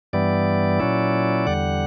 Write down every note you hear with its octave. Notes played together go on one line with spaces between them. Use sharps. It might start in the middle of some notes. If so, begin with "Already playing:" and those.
G2 E3 G3 B3 D5
A#2 F#3 C#4 E4
E2 D3 G3 F#5